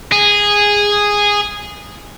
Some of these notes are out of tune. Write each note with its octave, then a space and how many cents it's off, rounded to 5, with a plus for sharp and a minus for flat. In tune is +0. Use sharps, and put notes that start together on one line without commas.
G#4 -10